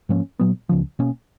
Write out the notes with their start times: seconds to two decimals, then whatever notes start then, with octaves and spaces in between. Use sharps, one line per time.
0.09 G#2 F3 A#3 C#4
0.39 A#2 F#3 B3
0.69 C#2 C#3 F3
0.99 B2 A#3 C#4